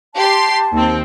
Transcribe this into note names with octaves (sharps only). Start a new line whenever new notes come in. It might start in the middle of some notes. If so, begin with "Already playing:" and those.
G4 A5 C6
D#2 C4